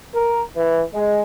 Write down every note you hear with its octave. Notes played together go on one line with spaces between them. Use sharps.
A#4
E3
G#3